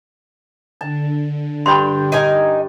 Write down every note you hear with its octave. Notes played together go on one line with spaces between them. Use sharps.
D3 A5
G2 G5 B5 C6
D#4 A#4 G#5